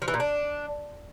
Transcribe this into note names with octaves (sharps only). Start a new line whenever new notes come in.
F3
E3
A#2
D4